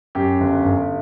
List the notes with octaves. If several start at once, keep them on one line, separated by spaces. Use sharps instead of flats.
F#2 G4
G1
G1